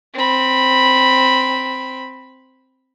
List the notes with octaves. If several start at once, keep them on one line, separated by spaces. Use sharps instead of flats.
C4 B5